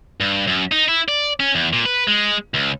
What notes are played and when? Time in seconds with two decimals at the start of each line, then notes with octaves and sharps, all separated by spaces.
0.20 G2
0.47 F#2
0.72 D#4
0.88 E4
1.08 D5
1.40 C#4
1.55 E2
1.73 A#2
1.86 B4
2.08 G#3
2.54 C#2